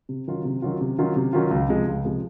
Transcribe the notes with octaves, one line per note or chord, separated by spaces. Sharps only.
C3
D#3 F#3 C#4 F4
C3
D#3 F#3 C#4 F4
C3
D#3 F#3 C#4 F4
C3
D#3 F#3 C#4 F4
C#2
C3 F3 G#3
C#2
C3 F3 G#3